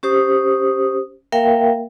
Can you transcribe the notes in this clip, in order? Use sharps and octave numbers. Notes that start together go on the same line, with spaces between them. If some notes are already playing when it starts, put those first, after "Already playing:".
C#4 G4 C5 D#6
A#3 A#4 E5 F5 G5